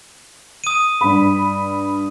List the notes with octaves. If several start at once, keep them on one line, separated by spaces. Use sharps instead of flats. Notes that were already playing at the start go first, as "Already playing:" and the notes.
D#6 D#7
G2 B5